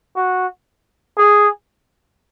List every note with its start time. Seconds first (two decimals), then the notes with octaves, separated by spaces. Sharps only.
0.16 F#4
1.18 G#4